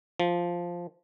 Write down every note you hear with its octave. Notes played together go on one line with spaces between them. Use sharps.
F3